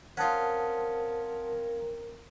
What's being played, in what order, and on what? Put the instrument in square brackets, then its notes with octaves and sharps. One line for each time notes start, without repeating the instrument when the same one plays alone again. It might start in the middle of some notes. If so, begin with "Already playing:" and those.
[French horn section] C4 A#4 [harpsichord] C#4 F4 [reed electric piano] F#5 A5 D#6